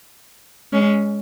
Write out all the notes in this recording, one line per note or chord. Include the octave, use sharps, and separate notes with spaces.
G#3 C#4